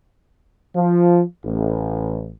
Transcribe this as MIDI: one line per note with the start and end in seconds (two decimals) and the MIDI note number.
0.76 1.23 53
1.46 2.31 33